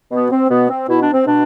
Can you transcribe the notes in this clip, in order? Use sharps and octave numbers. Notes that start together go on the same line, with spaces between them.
B2 B3
C4
B2 B3
C4
B2 E4
D4
C4
B2 D4